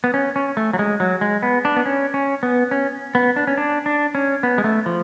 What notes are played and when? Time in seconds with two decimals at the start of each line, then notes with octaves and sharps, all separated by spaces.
0.04 B3
0.14 C#4
0.36 C#4
0.57 A3
0.73 F#3
0.79 G#3
1.00 F#3
1.21 G#3
1.43 B3
1.65 D4
1.76 B3
1.85 C#4
2.14 C#4
2.43 B3
2.71 C#4
3.15 B3
3.36 D4
3.47 C#4
3.58 D4
3.86 D4
4.15 C#4
4.43 B3
4.58 G#3
4.64 A3
4.86 F3